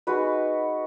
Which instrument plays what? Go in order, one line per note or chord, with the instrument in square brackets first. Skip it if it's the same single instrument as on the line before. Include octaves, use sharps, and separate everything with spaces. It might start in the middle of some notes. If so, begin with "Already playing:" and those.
[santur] G#3 D#4 F#4 B4